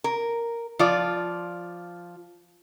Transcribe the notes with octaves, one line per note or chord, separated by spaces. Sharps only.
A#4
F3 F4 D5